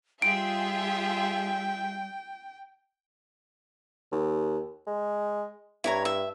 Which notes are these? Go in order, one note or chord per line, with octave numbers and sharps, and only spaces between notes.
G3 F4 G#4 E5 G5 D7
D#2
G#3
G2 E4 C#5 A#5
E5